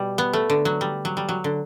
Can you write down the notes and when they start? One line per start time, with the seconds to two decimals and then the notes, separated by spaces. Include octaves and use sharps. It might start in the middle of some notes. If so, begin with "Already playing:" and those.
Already playing: B2 G3
0.18 B3
0.33 A3
0.50 D3
0.65 F#3
0.81 G3
1.05 F#3
1.17 G3
1.29 F#3
1.44 D3